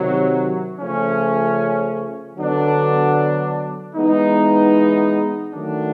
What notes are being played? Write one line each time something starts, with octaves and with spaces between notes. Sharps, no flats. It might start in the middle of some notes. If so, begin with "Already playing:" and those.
Already playing: C3 D#3 F#3
C#3 F3 A3 C#4
D3 F#3 B3 D4
E3 G#3 B3 D#4
D#3 F#3 A3 D4